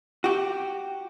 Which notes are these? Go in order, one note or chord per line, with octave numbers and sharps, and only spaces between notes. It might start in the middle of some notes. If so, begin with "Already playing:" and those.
F#4 G4